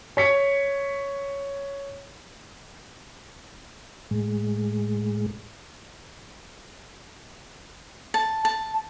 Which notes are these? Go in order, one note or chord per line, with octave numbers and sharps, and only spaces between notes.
C#5 B6 C#7
A2 G#3
A5
A5